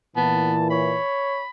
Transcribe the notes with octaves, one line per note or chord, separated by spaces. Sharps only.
A#2 E3 B3 A5
C#5 B5